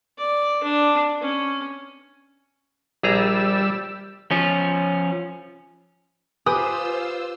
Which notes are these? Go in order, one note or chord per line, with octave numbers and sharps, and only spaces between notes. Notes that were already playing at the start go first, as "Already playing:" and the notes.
D5
D4
C#4
A#1 G3 G#4 A#5 E6
F3 C#4
F4 G4 B4 C5 G#5 D#6 E6